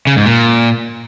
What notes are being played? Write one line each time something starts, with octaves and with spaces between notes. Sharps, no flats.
C#3
G#2
A#2